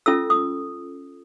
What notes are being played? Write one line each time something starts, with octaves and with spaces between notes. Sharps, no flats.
C#4 F4 A4 E6
D#6